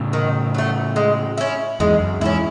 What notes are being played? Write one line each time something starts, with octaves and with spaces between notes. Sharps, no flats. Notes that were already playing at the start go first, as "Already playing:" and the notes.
Already playing: A2 C#3
D#3
F#3 A3
G#3
C#4 E4
E2 G#2 G#3
F#2
E2 G#2 C#4 E4